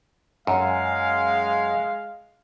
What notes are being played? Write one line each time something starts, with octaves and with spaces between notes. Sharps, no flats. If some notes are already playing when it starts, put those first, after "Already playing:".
F#2 G#3 F5